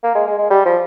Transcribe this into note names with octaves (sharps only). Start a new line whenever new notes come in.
A#3
G#3
G#3
G#3
G3
F3